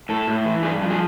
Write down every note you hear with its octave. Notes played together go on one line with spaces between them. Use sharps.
A2 A4
A2
E3
G2 G#4
F3
G#4